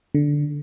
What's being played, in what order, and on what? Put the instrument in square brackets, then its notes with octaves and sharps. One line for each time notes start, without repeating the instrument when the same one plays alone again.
[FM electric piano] D3